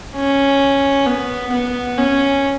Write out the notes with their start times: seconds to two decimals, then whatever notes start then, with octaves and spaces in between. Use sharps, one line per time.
0.15 C#4
1.06 B3
1.52 B3
1.98 C#4